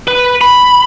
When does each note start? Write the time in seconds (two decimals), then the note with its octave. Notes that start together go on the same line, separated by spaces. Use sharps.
0.08 B4
0.41 B5